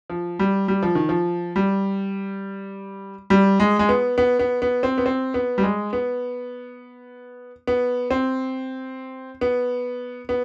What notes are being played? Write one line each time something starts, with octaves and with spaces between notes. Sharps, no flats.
F3
G3
G3
F3
D#3
F3
G3
G3
G#3
G#3
B3
B3
B3
B3
C4
B3
C4
B3
G3
G#3
B3
B3
C4
B3
B3